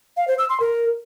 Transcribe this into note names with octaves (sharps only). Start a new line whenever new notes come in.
F5
C5
E6
C6
A#4